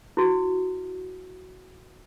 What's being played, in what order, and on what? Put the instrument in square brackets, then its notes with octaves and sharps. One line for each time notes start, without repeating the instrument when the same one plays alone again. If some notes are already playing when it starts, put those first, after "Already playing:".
[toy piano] E4 F#4